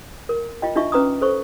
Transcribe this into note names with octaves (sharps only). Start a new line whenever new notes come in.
A#4
F4 D#5 G5
D4 D#4 F4 D#5 E5 C#6
C#4 B4 A#5 D6 D#6
A4 C5 C#6